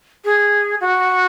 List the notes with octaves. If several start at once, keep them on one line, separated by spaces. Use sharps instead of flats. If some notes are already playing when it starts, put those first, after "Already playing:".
G#4
F#4